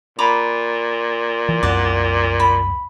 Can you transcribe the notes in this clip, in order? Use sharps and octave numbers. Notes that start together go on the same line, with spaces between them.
A#2 A#5 B5 D6
E3
C2 F#2 D5 F#5
B5